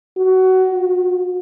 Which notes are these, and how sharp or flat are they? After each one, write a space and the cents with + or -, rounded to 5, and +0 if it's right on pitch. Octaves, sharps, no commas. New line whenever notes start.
F#4 +20
F#4 -45